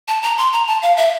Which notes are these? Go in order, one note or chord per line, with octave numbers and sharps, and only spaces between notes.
A5
A#5
C6
A#5
A5
F5
E5